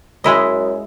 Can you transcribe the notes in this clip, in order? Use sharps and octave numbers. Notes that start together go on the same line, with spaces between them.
F#2 G#3 E4 D#5